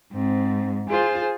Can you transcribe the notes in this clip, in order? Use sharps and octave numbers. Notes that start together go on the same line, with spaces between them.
G#2 C4
F4 G#4 C5